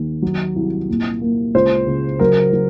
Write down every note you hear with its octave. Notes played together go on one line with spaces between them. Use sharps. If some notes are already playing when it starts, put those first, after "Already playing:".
Already playing: D#2
F#3
C2
A#2
A#3
C#2 C5
C#3
F#3 A#4
F#3